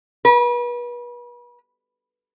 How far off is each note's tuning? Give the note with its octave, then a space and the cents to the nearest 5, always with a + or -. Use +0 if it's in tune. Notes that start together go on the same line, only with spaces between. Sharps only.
B4 -35